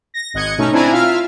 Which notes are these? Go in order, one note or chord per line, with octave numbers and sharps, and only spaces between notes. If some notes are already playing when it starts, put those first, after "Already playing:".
A#6
G#1 D#5 F#6 G#6 C#7
B2 A3 C#4 D#4 C#6
C4 D4 E4 G#5 A#5
F4 E5 F5 F6